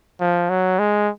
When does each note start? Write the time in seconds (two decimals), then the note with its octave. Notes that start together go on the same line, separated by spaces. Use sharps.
0.20 F3
0.50 F#3
0.79 G#3